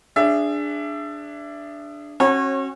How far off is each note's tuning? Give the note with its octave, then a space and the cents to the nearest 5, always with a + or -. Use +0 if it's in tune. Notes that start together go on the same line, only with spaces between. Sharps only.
D4 +0 G#4 -10 E5 +25
C#4 -40 F#4 +5 C#5 -30